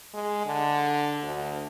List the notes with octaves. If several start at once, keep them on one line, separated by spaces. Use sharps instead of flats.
G#3
D3
D2